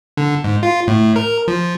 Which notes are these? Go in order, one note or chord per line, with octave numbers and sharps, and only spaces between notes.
D3
G#2
F4
A2
A#4
F3